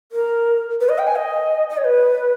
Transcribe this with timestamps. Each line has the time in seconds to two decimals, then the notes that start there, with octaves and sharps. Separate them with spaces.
0.12 A#4
0.80 B4
0.89 D#5
0.98 G5
1.07 G#5
1.16 D#5
1.70 D#5
1.77 C#5
1.85 B4